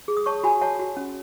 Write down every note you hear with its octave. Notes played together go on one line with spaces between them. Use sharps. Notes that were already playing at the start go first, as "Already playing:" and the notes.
G#4
D#6
C#5 A5 C#6
F#4 G#5 B5
C#5 F#5 A5
F#4
C#4